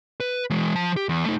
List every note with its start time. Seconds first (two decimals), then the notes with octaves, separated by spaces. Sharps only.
0.20 B4
0.50 E3 G#3
0.75 F3 A5
0.96 G4
1.09 E2
1.26 A3 D#4